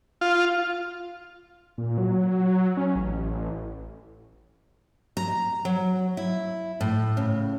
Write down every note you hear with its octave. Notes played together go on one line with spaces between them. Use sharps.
F4
A#2
F#3
C#4
A1
A#5
F#3
E4
A2
C#3